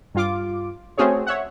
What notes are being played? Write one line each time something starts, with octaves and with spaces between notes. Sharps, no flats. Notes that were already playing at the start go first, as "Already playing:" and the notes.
G2 F4 D6
A3 C4 C#4 F#4 G#4 C#5
C#5 E5 F#5